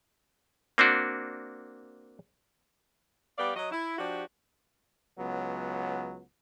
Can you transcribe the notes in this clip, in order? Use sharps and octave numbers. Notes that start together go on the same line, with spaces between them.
A#3 C4 D4 F#4
G3 B3 G4 D5 F5
F#3 D#5
E4
F3 D4 F#4 G4
C#2 F#3 B3